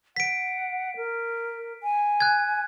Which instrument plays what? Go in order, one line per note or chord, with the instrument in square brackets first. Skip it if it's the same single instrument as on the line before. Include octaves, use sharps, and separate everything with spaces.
[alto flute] F#5 [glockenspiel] B6 D7
[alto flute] A#4
G#5
[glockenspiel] F#6 G#6